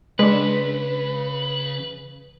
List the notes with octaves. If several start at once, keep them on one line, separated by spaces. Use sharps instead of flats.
C#3 G#3 D4 B4 C6